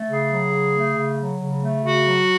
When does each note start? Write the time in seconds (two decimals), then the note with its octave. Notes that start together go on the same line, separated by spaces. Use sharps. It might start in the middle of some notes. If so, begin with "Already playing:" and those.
Already playing: A3
0.08 C#3 G#4
0.30 F#3
0.52 C#3
0.73 A3
0.95 C#3
1.17 F#3
1.39 C#3
1.61 A3
1.83 C#3 F#4
2.05 F#3